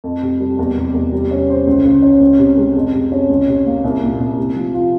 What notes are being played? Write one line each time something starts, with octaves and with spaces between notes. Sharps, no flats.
F2
C3
G3
E2
C3
E2
G3
C#4
C5
C#2
C#3
C#4
C#2
C3
G#3
F2
C3
C#4
C#2
C3
A#3
C2
A#2
C2
C3
F3
F4